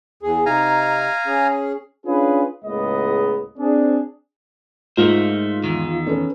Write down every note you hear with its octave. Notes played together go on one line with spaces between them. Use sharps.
E2 G#4
C3 D#4 F5 G#5 A#5
C#4 G#4
C#4 D4 F4 G#4 B4
C#2 A2 G#3 A#3 B3 D#5
C4 D4 G#4
G#2 A3 F4 A#4 C5
E2 D#3
C#4 A4 B4